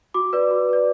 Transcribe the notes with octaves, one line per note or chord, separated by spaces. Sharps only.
F#4 D6
B4 D5
F#4
B4 D5